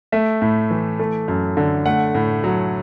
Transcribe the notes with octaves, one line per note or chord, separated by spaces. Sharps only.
A3 E5
A2
E3
A3
F#2
D3
A3 F#5
A2
F#3